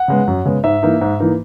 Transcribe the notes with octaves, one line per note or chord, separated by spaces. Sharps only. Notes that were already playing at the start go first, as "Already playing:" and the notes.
Already playing: F#5
C#3 G#3 B3
F#2
C#3 G#3 B3
G#2 E5
E3 A#3 D#4
G#2
E3 A#3 D#4